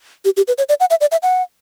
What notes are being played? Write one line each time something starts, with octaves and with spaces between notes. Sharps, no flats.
G4
G4
B4
C#5
D5
F#5
E5
D5
E5
F#5